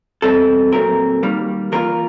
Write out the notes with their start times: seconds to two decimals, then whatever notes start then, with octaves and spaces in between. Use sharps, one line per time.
0.22 E2 B2 G3 C4 E4 A4
0.72 A#2 F#3 A3 C4 A#4
1.23 D#3 G3 A#3
1.72 E3 G3 A#3 D4 F4 A#4